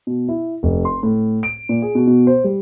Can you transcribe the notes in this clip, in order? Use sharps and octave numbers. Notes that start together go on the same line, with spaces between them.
B2
E4
F1
C6
A2
D7
A#2
G#4
B2
B2
C5
G3